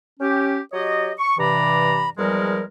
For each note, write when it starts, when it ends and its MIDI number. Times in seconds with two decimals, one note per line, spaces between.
0.20 0.59 61
0.20 0.59 67
0.73 1.11 54
0.73 1.11 67
0.73 1.11 73
0.73 1.11 75
1.18 1.38 85
1.38 2.08 43
1.38 2.08 48
1.38 2.08 52
1.38 2.08 74
1.38 2.08 82
1.38 2.08 83
2.18 2.62 40
2.18 2.62 53
2.18 2.62 55
2.18 2.62 56
2.18 2.62 70